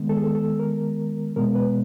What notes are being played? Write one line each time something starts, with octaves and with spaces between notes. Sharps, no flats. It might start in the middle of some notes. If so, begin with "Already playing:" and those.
Already playing: D#3 G#3 B3
A4
G#4
A4
A4
A#4
B2 G#3 B3 A#4
B4